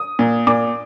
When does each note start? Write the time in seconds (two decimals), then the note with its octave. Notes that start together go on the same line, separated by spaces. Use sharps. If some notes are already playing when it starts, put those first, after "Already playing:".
Already playing: D#6
0.19 A#2
0.47 A#2 D6